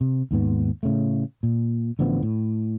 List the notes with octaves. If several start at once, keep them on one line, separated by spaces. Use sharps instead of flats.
C3
D#2 G#2 B3
A2 C#3 A3
A#2
A1 D3 F3 B3
A2